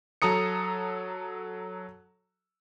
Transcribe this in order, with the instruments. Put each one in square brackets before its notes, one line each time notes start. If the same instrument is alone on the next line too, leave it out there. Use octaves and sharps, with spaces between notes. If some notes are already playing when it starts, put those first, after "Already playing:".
[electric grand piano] F#3 A4 A#5 D#6 C#7